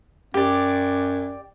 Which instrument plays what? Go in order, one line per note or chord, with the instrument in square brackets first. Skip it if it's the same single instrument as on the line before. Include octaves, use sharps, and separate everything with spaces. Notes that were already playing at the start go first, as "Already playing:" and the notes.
[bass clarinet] F#2 [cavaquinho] G4 D5